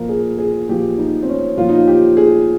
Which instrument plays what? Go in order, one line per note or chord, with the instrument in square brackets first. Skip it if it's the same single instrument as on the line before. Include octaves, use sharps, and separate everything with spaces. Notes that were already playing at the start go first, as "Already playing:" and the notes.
Already playing: [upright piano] A#2 F3 A#4
G#4
G#4
A#2 F3 G4
D#4
C4
C#4
A#2 F3 F4
D#4
F4
G4
G#4